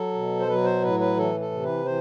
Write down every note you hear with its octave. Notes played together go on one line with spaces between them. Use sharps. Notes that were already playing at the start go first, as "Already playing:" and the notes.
Already playing: F#3 A4
B2
C5
F#3 B4
C5
A2 B4
B4
E3 A4
A4
C3
B4
E3 C5